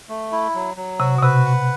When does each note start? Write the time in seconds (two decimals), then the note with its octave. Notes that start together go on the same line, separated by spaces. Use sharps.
0.09 A3
0.32 E4
0.55 F#3
0.77 F#3
1.00 C3 F#4
1.18 B2
1.23 C3 B4
1.45 F#5